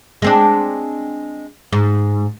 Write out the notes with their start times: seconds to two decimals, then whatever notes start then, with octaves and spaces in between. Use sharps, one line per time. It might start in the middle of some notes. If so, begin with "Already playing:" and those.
0.22 G#3 C4 D4
1.73 G#2